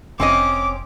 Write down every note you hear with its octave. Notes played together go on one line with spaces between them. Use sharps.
F1 C4 C#4 D#5 D6